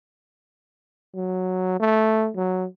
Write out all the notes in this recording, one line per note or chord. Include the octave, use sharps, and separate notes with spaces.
F#3
A3
F#3